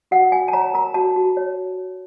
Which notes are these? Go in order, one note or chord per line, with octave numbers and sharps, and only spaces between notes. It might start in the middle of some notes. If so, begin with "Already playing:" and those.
F#4 F#5
F#4 G#5
A5
C#5 A#5
A#4 A#5
F#4 A5
F#4
C#5